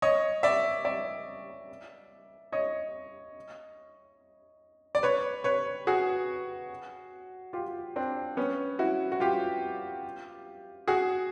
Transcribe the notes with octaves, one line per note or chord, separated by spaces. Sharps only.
C#5 D#5
D5 E5
D5 E5
C#5 D#5
D5
B4 C#5
B4 C#5
F#4 G#4
F4 G4
C4 D4
B3 C#4
E4 F#4
F#4
F4 G4
F#4 G#4